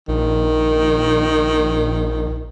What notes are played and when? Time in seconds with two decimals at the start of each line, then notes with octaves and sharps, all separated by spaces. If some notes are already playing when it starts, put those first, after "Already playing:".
0.08 A#1 D#3